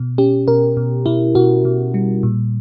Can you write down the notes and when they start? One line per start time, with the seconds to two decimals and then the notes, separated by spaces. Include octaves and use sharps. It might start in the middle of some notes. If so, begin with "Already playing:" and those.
Already playing: B2
0.18 C#4 G4
0.48 B2 A#4
0.77 B2
1.06 B2 E4
1.35 B2 F#4
1.65 B2
1.94 G3
2.23 A#2